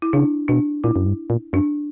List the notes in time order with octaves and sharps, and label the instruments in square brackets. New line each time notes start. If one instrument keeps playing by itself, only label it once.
[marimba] E4
[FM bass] C#3 [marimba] D4
[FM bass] B2 [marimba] D4
[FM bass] A#2 [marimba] E4
[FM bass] F#2
G2
A#2
[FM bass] F#2 [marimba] D4